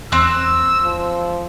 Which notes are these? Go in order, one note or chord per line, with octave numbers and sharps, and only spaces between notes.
E2 C4 E6 F#6
F3